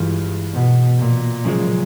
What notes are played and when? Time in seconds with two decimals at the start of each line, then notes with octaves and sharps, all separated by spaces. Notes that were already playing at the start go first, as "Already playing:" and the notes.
Already playing: G2 E3 G#3 F4
0.53 B2
0.99 A#2
1.45 F#2 C#3 F3 G#3